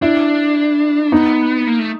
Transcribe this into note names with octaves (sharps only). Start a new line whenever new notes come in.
D4 E4
B3 D#4
A#3
A3